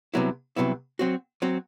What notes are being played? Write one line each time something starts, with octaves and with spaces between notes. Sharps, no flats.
C2 C3 F#3 B3 E4
C2 C3 F#3 B3 E4
F#3 C4 F#4
F#3 C4 F#4